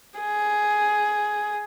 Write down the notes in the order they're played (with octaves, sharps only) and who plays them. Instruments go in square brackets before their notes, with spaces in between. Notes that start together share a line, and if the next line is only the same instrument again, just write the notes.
[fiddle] G#4